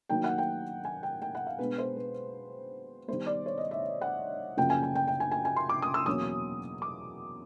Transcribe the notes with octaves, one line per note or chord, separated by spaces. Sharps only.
D#3 F#3 A#3 D#4 G5
F#5
G5
G#5
G5
G5
F#5
F5
B2 G#3 B3 D4 B4
C5
B4
D#3 G3 B3 C5
D5
C#5
D#5
E5
F#5
F#2 C#3 F3 A#3 G5
G#5
G#5
G5
G5
G#5
G#5
G#5
C6
D6
D#6
E6
E2 B2 F#3 A#3 C#4 D#6
D6